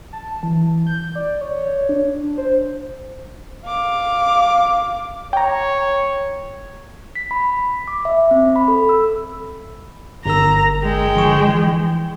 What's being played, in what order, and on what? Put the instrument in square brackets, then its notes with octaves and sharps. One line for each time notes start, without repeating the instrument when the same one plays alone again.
[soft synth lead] A5
E3
G6
D5
C#5
D4
C5
[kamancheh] F5 D6
[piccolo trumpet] C#5 [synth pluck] G5 A#5
[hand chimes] B6
B5
D6
E5
C4
B5
A4
E6
[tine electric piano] G1 A#4 E6 [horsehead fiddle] A#5
[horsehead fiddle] G#3 G5
[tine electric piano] D3 F3 C#6
E3